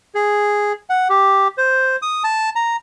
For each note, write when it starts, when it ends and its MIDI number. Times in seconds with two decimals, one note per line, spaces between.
0.15 0.73 68
0.90 1.08 78
1.10 1.48 67
1.58 1.96 72
2.02 2.23 87
2.24 2.50 81
2.55 2.76 82